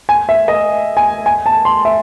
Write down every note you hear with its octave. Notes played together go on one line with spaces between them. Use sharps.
G#5
E5
D#5
G#5
G#5
A5
C6
E5